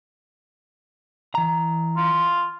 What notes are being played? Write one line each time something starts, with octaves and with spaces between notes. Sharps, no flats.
E3 A#5
F4